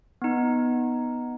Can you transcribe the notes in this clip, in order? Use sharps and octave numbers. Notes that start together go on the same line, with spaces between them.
B3 D#4